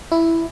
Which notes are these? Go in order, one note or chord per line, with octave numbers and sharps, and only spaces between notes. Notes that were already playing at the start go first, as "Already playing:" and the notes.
E4